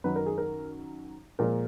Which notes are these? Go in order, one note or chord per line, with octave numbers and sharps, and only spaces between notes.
F#2 D#3 F#3 B4
A#4
G#4
A#4
A#2 F3 G#3 A#4